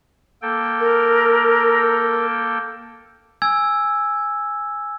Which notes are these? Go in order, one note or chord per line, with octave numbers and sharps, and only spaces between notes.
A#3 A4 G5
A#4
G#5 E6 G#6